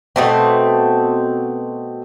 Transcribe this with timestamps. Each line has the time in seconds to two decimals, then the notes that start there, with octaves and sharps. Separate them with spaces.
0.16 B2 A3 C4